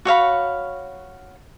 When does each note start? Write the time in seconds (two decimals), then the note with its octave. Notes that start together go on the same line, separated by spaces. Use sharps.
0.05 F#4 C#5 F5 B5